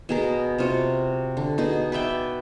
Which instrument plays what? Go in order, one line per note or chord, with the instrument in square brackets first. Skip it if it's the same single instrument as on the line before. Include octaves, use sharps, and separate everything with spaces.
[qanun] B2 G#4 A#4
C3 F4 F#4
D3
B2 D#4 G#4
B4 D5 E5 G5